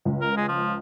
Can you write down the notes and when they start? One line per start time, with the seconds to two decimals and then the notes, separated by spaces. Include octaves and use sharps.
0.05 C#2
0.21 A#4
0.37 G#3
0.48 F3